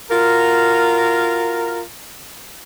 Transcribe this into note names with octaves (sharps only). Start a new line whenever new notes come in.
F4 F#4 A#4